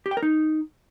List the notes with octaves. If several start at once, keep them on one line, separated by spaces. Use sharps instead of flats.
G4
G5
A#4
D#4